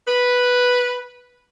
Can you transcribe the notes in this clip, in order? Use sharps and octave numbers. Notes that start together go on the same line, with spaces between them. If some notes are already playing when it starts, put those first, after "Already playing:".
B4